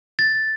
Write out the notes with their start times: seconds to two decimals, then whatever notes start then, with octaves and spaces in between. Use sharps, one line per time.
0.19 A6